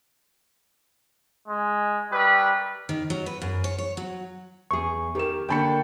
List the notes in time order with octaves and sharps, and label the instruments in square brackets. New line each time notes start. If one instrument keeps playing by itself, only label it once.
[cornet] G#3
[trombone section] C2 D#4 B4 [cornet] G3
[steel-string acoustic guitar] D#3
F#3
B4
F#2
C#5
C#5
F#3
[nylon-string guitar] E2 G#4 [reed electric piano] C#6
[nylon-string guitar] D#3 [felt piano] G4 A#4 E7
[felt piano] D3 B5 C#7 [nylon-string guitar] A#3 D4 [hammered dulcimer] G5 A5 C#6